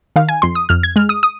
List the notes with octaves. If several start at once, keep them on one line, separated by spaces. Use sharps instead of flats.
D#3 F5
G#5
F2 C6
D#6
F2 F6
G#6
G#3 F6
D#6
D#6